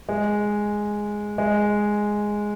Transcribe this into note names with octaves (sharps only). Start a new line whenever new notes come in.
G#3
G#3